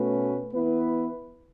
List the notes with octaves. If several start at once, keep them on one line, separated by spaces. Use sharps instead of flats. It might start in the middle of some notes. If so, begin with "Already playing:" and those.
Already playing: B2 A3 C#4 F#4 B4
E3 B3 E4 B4